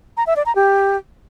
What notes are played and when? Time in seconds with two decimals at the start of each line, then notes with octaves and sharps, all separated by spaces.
0.17 A#5
0.27 E5
0.36 D5
0.46 A#5
0.55 G4